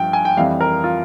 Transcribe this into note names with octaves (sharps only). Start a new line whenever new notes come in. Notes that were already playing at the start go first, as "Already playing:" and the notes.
Already playing: G2 F3 G5
G#5
G5
F2 E3 G3 F5
A#4
F4